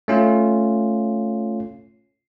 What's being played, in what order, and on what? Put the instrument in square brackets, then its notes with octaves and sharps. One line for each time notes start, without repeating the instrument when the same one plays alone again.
[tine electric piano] A3 C#4 F4